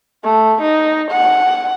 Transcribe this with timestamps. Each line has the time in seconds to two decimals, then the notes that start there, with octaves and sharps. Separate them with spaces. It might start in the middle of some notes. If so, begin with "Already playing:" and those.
0.24 A3
0.62 D#4
1.11 F#5